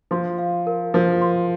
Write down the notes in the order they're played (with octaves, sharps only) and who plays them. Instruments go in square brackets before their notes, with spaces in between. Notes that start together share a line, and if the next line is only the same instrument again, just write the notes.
[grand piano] F3 [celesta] C6
[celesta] F5
A#4
[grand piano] F3 [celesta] A#4
[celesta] C6